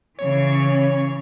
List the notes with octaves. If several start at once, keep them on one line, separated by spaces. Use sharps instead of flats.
C#3 E3 C#5